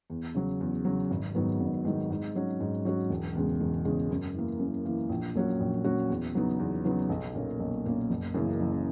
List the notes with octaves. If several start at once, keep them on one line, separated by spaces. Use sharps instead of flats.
E2
C#3 F#3
E2
C#3 F#3
G#1
G#2 D#3 F#3 B3
G#1
G#2 D#3 F#3 B3
G#2
F#3 C#4 F#4
G#2
F#3 C#4 F#4
E1
E2 C#3 G#3
E1
E2 C#3 G#3
F#2
E3 A#3
F#2
E3 A#3
A#1
A#2 F#3 C#4 F#4
A#1
A#2 F#3 C#4 F#4
E2
C#3 F#3 B3 D#4
E2
C#3 F#3 B3 D#4
B1
A#2 A#3 C#4
B1
A#2 A#3 C#4
F#1
F#2 C#3 E3 A#3
F#1